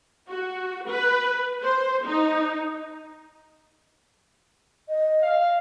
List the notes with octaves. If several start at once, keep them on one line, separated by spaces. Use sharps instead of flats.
F#4
B4
C5
D#4
D#5
F5